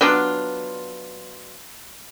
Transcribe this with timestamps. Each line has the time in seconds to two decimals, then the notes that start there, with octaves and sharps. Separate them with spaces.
0.01 F#3 B3 D4 F4